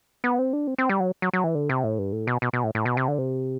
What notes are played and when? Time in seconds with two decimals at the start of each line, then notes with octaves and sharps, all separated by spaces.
0.24 B3
0.39 C4
0.53 D4
0.67 C4
0.78 C4
0.89 G3
1.00 F#3
1.22 F#3
1.33 F#3
1.44 E3
1.55 D3
1.69 C3
1.84 A2
1.99 G2
2.12 A2
2.27 B2
2.42 B2
2.53 B2
2.64 A2
2.75 A2
2.85 B2
2.97 C3
3.08 D3
3.18 C3